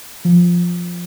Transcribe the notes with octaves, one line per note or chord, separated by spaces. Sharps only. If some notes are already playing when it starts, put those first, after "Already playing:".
F3